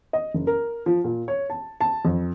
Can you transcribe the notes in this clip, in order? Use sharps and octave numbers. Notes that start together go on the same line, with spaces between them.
D#5
F#1
A#4
F3
A#2
C#5
A5
A5
F2